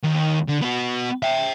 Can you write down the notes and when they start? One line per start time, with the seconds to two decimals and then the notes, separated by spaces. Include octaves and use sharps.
0.04 D#2
0.49 D3
0.62 B3 F#4
1.23 E5 G5